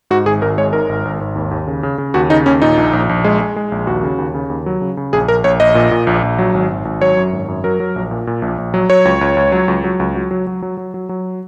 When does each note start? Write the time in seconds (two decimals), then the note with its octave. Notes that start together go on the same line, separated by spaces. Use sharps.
0.11 G#2 F#4
0.26 G#1 G#4
0.42 G#1 A#4
0.58 G#3 C#5
0.73 G#2 A#4
0.89 G#1
1.05 G#1
1.21 G#1
1.35 D#2
1.51 D#2
1.67 C#3
1.83 C#3
1.98 C#3
2.14 D#2 F#4
2.30 C#3 D#4
2.46 D#2 C#4
2.62 A#2 D#4
2.77 A#1
2.93 A#1
3.09 A#1
3.24 G#3
3.41 G#3
3.56 G#3
3.72 A#1
3.87 D#2 F#4
4.03 C#3
4.18 D#2
4.35 C#3
4.50 D#2
4.66 F#3
4.81 C#3
4.97 C#3
5.13 A#1 G#4
5.28 A#1 A#4
5.44 A#1 C#5
5.60 A#1 D#5
5.75 A#2
5.91 A#2
6.07 A#1
6.23 A#1
6.38 F#3
6.54 G#1
6.70 G#1
6.85 G#1
7.01 F#3 C#5
7.17 F#2
7.33 G#1
7.48 F#2
7.64 F#3 A#4
7.80 F#3
7.96 A#1
8.11 A#2
8.27 A#2
8.42 A#1
8.58 A#1
8.74 F#3
8.90 F#3 C#5
9.05 C#2
9.21 C#2
9.37 C#2
9.52 F#3
9.68 C#2
9.84 F#3
10.00 C#2
10.15 F#3
10.31 F#3
10.47 F#3
10.62 F#3
10.77 F#3
10.94 F#3
11.09 F#3